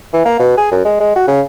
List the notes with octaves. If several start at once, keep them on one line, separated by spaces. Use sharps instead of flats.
E3
A#3
B2
G#4
F#2
G#3
G#3
F#4
C#3